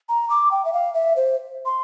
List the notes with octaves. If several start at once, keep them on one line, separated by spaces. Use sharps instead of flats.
A#5
D6
G5
E5
F5
E5
C5
C6